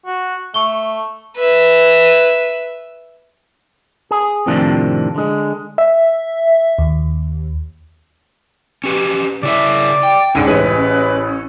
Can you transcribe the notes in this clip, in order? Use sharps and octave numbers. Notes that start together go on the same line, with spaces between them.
F#4
A3 C#6 G7
B4 E5
G#4
F2 A2 C3 D#3 F3 D4
D3 G#3
E5
D#2
C#4 G4 B4
C#3 E4 D5 E5
G5
C#2 G#2 D3 C#4 D#7
A1 C3 G#3 B4